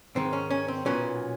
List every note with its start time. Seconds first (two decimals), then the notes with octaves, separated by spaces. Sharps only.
0.15 G#2 D#3 G#3 C4
0.33 C#4
0.51 C#4
0.68 C4
0.85 B1 A#2 F#3 B3 C#4